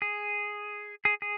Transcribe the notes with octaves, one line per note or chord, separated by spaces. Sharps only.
G#4
G#4
G#4